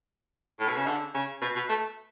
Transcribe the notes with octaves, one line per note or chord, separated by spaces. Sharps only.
A2
B2
C#3
D3
C#3
B2
B2
A3